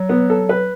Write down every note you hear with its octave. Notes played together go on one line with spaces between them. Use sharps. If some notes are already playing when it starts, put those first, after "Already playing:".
Already playing: F#3
B3
A4
B4